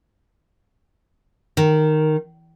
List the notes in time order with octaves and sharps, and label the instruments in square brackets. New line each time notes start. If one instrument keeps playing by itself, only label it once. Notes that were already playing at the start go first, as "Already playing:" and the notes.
[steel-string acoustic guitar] D#3